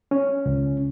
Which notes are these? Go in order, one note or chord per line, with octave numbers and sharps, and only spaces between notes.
C#4
C#2